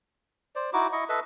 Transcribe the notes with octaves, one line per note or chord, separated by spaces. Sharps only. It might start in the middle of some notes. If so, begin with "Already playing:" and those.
C5 D5
D#4 E4 F#4 D6
E4 D#5 C#6
A4 B4 D#5 E5